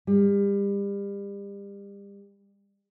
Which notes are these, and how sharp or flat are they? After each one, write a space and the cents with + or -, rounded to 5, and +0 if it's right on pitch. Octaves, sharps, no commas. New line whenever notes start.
G3 +35